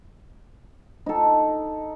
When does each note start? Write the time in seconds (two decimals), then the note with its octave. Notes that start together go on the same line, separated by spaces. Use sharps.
1.06 D#4 A4